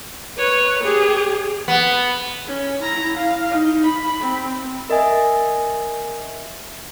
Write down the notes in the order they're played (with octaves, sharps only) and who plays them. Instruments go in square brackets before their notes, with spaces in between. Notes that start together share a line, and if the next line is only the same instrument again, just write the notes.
[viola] B4 C#5
G4 G#4
[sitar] B3
[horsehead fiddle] C#4
E4 A#5
F5
D#4
B5
C4
[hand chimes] A#4 D#5 E5 G#5